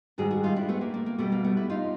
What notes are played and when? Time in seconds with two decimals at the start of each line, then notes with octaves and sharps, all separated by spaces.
0.18 G#2 D#3 G3 F#4 G#4
0.31 F#4 G#4
0.43 D#4 F4
0.56 D4 E4
0.69 A3 B3
0.81 A#3
0.94 A#3
1.06 A#3
1.18 B2 G3 A3
1.32 A#3
1.44 A3 B3
1.57 D4 E4
1.70 D#4 F4